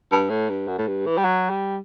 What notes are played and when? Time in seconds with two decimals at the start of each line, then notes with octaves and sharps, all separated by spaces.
0.12 G2
0.30 A2
0.49 G2
0.68 F#2
0.79 A2
0.87 G2
1.06 E3
1.18 G3
1.25 F#3
1.50 G3